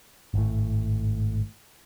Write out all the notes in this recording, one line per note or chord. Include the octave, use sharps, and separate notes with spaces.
G#1 A2